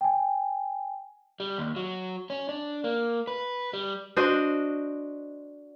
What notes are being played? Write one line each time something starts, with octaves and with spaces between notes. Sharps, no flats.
G5 G#5
G3
D#2
F#3
C#4
D4
A#3
B4
G3
D4 F#4 C5 D#5